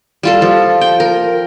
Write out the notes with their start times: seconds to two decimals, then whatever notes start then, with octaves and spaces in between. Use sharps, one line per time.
0.23 G3 F4 A4
0.42 F3
0.81 G5
1.00 A#4